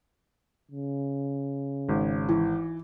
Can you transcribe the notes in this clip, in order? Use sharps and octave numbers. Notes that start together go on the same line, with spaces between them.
C#3
G#1
E3